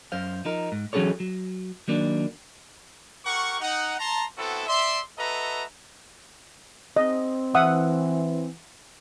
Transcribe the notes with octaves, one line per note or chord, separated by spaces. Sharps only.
F#2 C5 F5
F3 D#4 A#4
G#2
E3 F#3 C#4 G#4 A4 C#5
F#3
D#3 F#3 A#3 D4
G4 A#4 F#5 C#6
D#4 F#5
A5 A#5 C6
B3 C4 E4 F#4 A4
D5 E5 C6
F#4 A4 B4 D#5 E5 A#5
C4 D#5
E3 E5 F#5 D#6